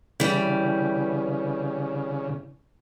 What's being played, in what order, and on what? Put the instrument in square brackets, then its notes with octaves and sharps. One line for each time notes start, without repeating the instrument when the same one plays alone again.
[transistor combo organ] C#3 [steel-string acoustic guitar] E3 G3